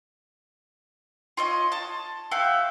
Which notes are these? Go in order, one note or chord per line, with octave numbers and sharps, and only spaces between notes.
F4 C#5 D#5
A5
F#4 E5 F5 G5